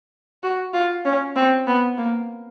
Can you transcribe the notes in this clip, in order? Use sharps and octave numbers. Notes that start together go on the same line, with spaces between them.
F#4
F4
C#4
C4
B3
A#3